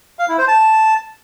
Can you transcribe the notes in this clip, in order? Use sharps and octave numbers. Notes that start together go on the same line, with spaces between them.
F5
E4
C5
A5